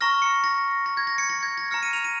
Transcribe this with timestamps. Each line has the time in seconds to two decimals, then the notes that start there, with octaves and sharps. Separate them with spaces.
0.01 A#5 C#6 F6 A#6
0.22 C#7
0.44 A#6
0.86 A#6
0.97 G#6
1.07 A#6
1.18 C#7
1.30 A#6
1.43 G#6
1.57 A#6
1.71 A#5 F6 C#7
1.83 D#7
1.93 F7
2.04 D#7